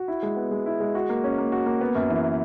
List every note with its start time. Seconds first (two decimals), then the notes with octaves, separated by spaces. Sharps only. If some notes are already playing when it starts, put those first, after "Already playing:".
Already playing: F#4
0.08 E4
0.23 G#3
0.36 B3
0.51 G#3
0.66 E4
0.80 G#3
0.95 F#4
1.09 A#3
1.24 C#4
1.38 A#3
1.52 F#4
1.66 A#3
1.81 B3
1.95 F#2
2.10 E3